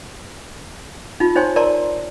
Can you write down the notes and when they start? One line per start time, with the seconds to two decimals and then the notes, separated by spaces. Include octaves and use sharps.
1.20 D#4 F4
1.36 D#4 C5 C#5 G#5 C6
1.56 A#4 D5 A5 A#5 C6